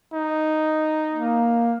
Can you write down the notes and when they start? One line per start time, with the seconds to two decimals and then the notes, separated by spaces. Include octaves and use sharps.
0.13 D#4
1.13 A#3